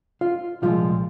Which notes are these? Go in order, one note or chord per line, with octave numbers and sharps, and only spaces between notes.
F4 F5
C2 A#2 F3 G#3 F4 F5